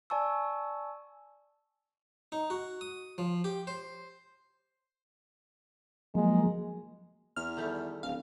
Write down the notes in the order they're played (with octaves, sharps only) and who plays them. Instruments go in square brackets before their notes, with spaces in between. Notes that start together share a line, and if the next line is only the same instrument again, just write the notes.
[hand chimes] D5 G#5 A5 C#6 E6
[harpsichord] D#4
F#4
D#6
F3
G4
C5
[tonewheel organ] F3 F#3 A#3 [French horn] G#3
[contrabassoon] E2 [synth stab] F6
[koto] D#3 G3 A3
[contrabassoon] D1 [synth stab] F5